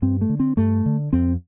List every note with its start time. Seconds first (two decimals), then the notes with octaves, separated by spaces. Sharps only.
0.02 G2 C4
0.21 A3
0.29 D3
0.40 C4
0.57 G2 A3
0.86 D3
1.13 F2 C4